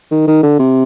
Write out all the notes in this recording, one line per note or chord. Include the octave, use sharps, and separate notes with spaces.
D#3
D#3
D3
C3